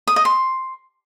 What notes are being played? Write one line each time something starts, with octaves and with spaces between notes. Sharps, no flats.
D#6
D#5
C6